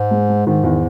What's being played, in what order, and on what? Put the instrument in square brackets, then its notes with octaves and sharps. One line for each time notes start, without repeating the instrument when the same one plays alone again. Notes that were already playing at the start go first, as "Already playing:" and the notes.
Already playing: [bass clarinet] G#2
[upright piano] G#3
G#3
[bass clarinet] G#2 [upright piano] D#3
[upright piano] E2